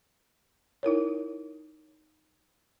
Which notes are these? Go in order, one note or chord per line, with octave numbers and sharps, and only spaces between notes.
D#4 E4 A#4 C#5